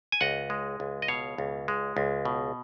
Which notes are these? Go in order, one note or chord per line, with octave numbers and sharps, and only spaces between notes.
G#5
C#2 D#5 F#5
G#3
C#2
D#5
B2 C#5 F5
C#2
G#3
C#2
B2